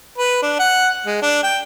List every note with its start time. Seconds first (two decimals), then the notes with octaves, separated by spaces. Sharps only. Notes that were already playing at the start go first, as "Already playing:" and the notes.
0.18 B4
0.42 D4
0.59 F#5
1.06 G#3
1.22 D4
1.44 G5